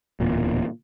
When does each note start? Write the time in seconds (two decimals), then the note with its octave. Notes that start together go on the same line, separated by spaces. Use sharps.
0.20 D1 E2 A#2